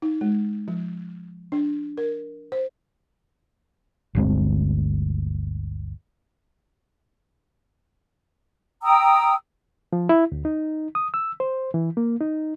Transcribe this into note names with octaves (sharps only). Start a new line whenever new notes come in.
D#4
G#3
F3
D4
A#4
C5
G1 D2 G#3 C4
G5 A#5 D#6 E6
F3
E4
D2
D#4
D#6
E6
C5
E3
A#3
D#4